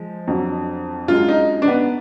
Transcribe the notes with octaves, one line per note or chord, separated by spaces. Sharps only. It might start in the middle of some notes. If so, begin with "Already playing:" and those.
Already playing: F3 G#3
F2 D3 F#3
F#2 D3 G#3 F4
D#4
D4
B3